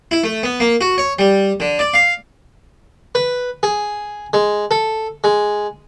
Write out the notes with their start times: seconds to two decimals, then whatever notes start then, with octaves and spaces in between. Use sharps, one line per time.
0.11 E4
0.24 A3
0.43 B3
0.60 A#3
0.81 F#4
0.98 C#5
1.19 G3
1.60 D3
1.79 D5
1.94 F5
3.15 B4
3.63 G#4
4.33 G#3
4.71 A4
5.24 G#3